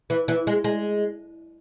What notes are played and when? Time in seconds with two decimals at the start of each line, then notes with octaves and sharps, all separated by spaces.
0.10 E3
0.28 E3
0.47 G#3
0.64 G#3